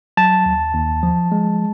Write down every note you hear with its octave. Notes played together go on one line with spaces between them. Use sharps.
F#3 A5
D#2
D#2
F3
G#3